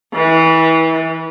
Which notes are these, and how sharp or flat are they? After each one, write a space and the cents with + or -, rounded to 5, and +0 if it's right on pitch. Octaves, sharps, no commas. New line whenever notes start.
E3 -25